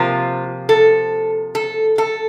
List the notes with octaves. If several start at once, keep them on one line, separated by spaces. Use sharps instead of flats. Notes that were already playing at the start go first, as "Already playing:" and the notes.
Already playing: C3 F3 A#3 F4
A4
A4
A4